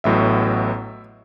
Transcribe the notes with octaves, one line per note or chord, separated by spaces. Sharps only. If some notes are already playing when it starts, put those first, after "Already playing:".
A1 A2 F#3 B3 E5